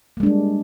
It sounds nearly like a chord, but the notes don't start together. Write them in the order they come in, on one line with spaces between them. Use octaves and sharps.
A#3 G#3 D4 G3